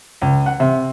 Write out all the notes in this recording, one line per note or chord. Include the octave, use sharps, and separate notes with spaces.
C#2
F#5
C3